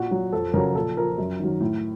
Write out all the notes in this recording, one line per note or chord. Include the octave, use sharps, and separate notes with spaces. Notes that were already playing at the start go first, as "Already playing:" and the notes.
Already playing: A#2 F#4
F#3
F2 A4
C#3 F#3 A#4
A#2 A4
F3 A#4
F#2
D#3 F#3
A2